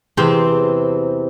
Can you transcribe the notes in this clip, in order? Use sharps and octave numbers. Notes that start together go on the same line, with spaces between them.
E2 C3 C4 C5